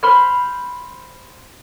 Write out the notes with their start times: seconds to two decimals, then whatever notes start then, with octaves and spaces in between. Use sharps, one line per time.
0.03 C5 B5 F6